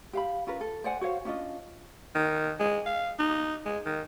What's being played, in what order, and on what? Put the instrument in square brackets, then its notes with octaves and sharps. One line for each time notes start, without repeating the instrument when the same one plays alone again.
[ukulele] G4 F5 B5
C#4 F4 A#4 B4
A4
C5 D5 F#5 G#5
F#4 C5 C#5 F5
C#4 D4 F4 D#5
[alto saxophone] D#3
G#3
F5
D#4
G#3
D#3